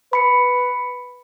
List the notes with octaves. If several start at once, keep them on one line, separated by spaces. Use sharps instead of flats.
B4 B5 C#7